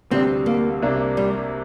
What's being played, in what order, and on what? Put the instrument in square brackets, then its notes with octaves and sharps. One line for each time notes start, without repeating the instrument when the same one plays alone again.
[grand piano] D2 C3 G3 D4 [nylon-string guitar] C4
[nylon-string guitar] A#3
[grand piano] C2 C3 A#3 D4
[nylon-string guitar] G3